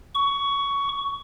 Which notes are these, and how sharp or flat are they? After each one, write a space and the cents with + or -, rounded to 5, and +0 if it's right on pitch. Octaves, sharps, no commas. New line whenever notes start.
C#6 +15